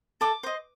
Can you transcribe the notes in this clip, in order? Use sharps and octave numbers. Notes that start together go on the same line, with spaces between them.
A4 D6
C5 D#5